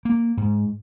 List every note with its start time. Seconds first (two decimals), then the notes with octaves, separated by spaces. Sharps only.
0.05 A#3
0.37 G#2